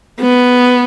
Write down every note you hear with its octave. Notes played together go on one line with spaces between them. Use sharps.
B3